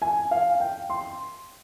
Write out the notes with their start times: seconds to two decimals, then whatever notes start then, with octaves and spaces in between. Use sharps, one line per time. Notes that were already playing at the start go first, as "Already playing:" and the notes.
0.02 G#5
0.31 F5
0.60 G5
0.90 C6